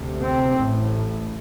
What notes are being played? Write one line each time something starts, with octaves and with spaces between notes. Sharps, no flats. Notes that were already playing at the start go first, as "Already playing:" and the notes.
Already playing: D2 C3
C4
A1 A2